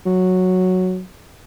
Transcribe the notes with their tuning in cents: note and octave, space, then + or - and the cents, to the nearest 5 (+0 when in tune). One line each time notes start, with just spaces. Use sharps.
F#3 -5